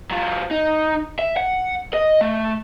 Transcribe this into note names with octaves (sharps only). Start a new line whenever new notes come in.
F#3 F4
D#4
E5
F#5
D#5
A3